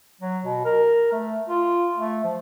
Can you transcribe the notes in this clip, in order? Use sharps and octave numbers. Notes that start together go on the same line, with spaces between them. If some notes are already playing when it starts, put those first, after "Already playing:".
F#3
B2
A#4
A3
F4
A3
F3